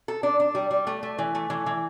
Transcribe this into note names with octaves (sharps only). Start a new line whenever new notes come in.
A4
D4
D4
G3
G3
A3
A3
E3
A3
E3
E3